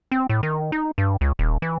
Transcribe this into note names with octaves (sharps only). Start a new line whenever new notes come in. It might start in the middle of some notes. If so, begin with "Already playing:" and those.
C4
A2
D#3
D#4
G2
C#2
D#1
E3